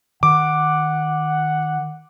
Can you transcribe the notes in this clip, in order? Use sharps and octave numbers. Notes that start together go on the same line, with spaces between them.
D#3 F#5 D6